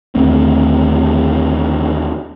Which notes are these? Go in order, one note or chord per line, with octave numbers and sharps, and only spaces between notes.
D#2 D3 A3 C4